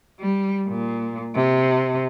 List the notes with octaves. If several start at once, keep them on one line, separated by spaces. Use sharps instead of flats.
G3
A#2
C3